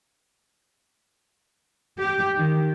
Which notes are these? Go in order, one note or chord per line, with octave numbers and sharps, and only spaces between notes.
G4
D#3